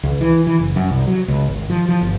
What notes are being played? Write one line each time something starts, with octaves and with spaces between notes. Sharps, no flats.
C#2
E3
E3
F#1
F#2
C2
F#3
C#2
G#1
F3
F3
G1